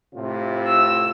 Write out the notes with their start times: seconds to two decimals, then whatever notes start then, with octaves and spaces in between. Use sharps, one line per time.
0.15 A2 C3 F4
0.67 E6